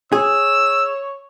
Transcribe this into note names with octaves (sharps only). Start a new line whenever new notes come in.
G#4 C#5 E6